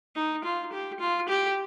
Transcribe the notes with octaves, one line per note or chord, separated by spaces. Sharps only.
D#4
F4
G4
F4
G4